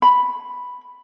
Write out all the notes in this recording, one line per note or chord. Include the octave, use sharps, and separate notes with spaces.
B5